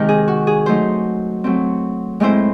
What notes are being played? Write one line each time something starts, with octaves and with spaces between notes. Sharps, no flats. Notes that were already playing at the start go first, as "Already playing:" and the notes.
Already playing: C3 D#3 G#3 D#4
G#4
F#4
G#4
F#3 A3 D#4 C5
F#3 A3 C4
A2 G#3 C4 E4 C5